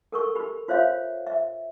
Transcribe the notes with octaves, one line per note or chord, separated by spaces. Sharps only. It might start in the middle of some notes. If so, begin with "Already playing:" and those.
A4 A#4 C#6
G4 B5
F4 C5 C#5 E5 F5
E5